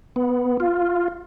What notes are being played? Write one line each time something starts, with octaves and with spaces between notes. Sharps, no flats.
B3
F4